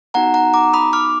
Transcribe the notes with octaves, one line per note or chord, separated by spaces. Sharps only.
B3 D#4 F#4 F#5 A#5
F#5 A#5
A#5 D6
B5 D#6
D6 F6